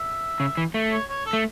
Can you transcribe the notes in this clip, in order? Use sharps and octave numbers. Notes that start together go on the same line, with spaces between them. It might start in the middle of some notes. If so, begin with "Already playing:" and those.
Already playing: E5
C#3
E3
A3
C#5
C#5
A4
A3